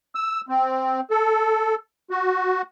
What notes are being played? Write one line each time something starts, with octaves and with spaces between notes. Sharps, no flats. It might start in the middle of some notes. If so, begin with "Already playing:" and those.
E6
C4
A4
F#4